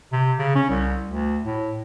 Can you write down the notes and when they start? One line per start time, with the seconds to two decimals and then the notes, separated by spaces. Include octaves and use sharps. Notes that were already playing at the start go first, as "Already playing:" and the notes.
0.12 C3
0.39 C#3
0.55 C#4
0.70 C2
1.07 D2
1.45 A2